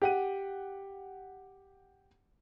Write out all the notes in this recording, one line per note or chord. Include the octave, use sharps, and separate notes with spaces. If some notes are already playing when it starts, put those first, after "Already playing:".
G4 F#5 D#7